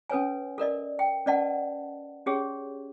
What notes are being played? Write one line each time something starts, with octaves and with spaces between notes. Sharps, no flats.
C#4 A4 B4 C#5 G#5
A4 A#4 D5 D#5
G5
C#4 B4 D5 D#5 F#5 A5
C#4 G4 G#4 C#5